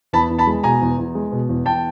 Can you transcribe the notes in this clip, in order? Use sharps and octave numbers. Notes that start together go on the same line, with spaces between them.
E2 A5 B5
E2
A5 B5
G#3
B2 G#5 A#5
E2
E2
G#3
B2
E2
E2 G5 A5